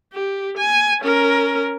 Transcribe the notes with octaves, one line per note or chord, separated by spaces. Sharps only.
G4
G#5
C#4 A#4